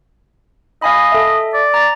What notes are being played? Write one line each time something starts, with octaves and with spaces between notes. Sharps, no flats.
D#5 F5 G#5 B5
A4 E5
D5
A#5 A6